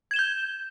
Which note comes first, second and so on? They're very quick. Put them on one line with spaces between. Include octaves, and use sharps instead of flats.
G#6 E7 G7 G6